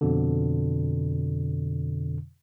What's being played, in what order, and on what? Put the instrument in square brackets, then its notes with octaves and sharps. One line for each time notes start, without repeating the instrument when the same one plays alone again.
[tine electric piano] F2 B2 D3